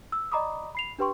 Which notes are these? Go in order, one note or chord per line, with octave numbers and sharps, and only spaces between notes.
E6
D5 D#5 A#5 B5 D6 D#6
B5 C7 F7
D4 G4 B4 G5 C6 C#6